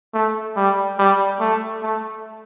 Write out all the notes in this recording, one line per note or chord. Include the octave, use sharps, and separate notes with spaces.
A3
G3
G3
A3
A3